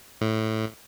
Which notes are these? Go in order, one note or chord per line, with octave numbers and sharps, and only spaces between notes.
A2